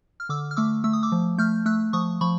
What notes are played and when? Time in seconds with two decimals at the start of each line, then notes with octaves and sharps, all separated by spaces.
0.20 F6
0.29 D3 D6 E6
0.51 F6
0.56 A3 D6 E6
0.84 A3 E6
0.93 D#6
1.03 D6 E6
1.12 F3
1.38 A3 F6 G6
1.66 A3 E6 F#6
1.93 F3 C#6 D#6
2.21 F3 B5 C#6